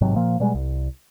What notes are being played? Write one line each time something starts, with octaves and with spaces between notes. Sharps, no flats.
A1 G#2 C3 F#3
A#2 F3 A#3
B2 G3 G#3
C2